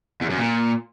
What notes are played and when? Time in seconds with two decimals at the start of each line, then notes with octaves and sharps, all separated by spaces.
0.21 E2
0.29 F#2
0.38 A#2